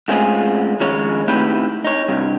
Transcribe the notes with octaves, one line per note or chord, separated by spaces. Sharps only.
G#2 A3 C4 C#4 F4 G#4
D#3 F3 G#3 C#4 C#5
A3 C4 D#4 E4 G4 B4
D#4 C#5
G2 C3